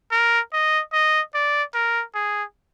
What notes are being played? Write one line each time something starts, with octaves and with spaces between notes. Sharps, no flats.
A#4
D#5
D#5
D5
A#4
G#4